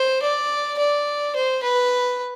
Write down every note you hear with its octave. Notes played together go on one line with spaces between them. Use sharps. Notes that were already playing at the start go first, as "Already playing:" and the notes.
Already playing: C5
D5
D5
C5
B4